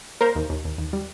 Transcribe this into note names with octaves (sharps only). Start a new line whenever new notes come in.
A#3 A#4 C5
D#2
D#2
D#2
D#2
G3